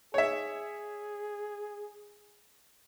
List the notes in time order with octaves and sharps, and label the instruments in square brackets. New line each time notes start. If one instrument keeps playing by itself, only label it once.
[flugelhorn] G#4 [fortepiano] C#5 E5